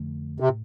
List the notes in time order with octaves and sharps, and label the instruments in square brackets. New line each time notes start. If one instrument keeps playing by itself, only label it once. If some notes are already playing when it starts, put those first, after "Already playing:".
Already playing: [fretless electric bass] F2 D3 F3 A3
[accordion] C3
[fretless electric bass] A2